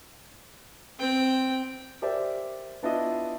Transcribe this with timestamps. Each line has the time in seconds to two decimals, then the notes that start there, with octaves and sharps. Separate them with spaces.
0.99 C4 G5
2.02 G4 A#4 C5 D5 E5 G5
2.83 B3 D4 E4 F4 D#5